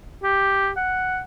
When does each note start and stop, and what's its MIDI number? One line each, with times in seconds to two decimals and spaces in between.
0.23 0.70 67
0.77 1.21 78